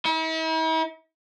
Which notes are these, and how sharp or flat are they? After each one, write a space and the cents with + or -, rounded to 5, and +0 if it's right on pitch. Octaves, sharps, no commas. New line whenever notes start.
E4 -45